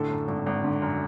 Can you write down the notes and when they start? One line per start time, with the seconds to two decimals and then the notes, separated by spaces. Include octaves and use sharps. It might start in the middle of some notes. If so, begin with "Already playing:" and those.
Already playing: A2 D3 A4
0.10 F#2
0.28 G#1
0.46 G#1
0.64 D3
0.82 F#2